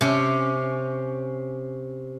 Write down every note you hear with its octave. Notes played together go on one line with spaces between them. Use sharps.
C3 C#4